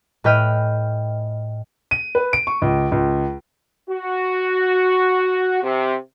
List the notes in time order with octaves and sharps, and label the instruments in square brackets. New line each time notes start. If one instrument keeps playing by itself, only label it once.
[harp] A2 B4 D#5 G5 F6 D#7
[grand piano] D#7
B4
D7
C#6
C#2
C#2
[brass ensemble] F#4
C3